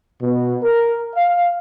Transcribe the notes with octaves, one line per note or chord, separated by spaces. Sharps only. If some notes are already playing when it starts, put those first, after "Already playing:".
B2
A#4
F5